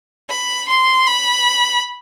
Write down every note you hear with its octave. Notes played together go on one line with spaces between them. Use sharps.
B5
C6
B5